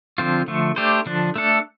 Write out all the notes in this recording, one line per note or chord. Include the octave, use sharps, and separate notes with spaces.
D3 F3 C4 F4
D3 F3 A3
A3 D4 G4 C5
D3 F3 D4
A3 D4 A4